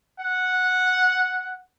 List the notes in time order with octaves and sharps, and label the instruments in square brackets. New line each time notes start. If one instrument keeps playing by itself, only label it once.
[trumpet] F#5